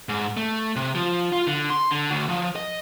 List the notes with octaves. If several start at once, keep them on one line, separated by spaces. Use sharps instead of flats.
G#2
A3
C3
F3
F4
D3
C6
D3
D2
F3
D#5